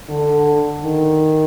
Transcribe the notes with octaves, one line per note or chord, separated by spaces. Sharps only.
D3
D#3